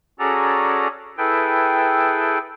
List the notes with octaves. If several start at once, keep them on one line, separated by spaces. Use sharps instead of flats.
C#4 F#4 G#4 A4 D5 A#5
E4 G#4 A4 B4 G5